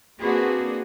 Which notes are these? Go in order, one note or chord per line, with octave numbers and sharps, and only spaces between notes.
A#3 C4 D4 F#4 G#4 B4